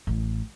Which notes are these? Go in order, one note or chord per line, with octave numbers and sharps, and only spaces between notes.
A1